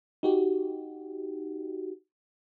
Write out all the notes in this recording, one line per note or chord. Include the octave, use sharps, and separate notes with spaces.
D#4 F#4 G4